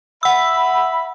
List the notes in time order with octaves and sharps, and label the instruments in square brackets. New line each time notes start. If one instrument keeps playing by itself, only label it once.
[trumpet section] E5 B5 [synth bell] F#5 E6